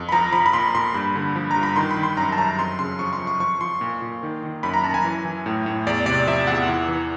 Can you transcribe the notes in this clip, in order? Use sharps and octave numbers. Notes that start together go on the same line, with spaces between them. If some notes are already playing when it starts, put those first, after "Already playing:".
Already playing: F2
B5
F3 A#5
F3 B5
B5
A#2 C6
A#2 C6
G2 B5
D3
F3
A#5
G2
B5
D#3 C6
B5
D#3
C6
F#2 A#5
A5
F#2 A#5
F2 C6
C#3 C6
F3 C#6
C6
F2
C#6
F3 C#6
F3 C6
A#2
A#2
D#3
D#3
F#2 B5
A#5
F#2 A5
G#5
E3
E3
A2
A2
E2 D5
C3 D5
F3 E5
E2 F#5
E3
E3